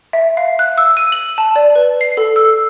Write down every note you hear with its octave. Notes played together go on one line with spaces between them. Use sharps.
E5
F5
F#6
E6
D#7
F#7
A5
D5
B4
C7
A4
E6